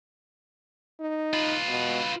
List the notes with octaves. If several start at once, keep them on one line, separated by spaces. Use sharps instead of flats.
D#4
F4 B4
B2